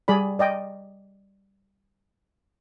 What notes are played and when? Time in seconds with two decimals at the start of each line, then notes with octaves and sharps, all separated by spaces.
0.08 G3 G#4 D5 B5
0.39 D5 D#5 G5